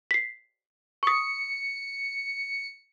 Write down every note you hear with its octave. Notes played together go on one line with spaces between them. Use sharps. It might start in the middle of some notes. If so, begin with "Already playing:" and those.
B6 C7
C#6 D#6 C#7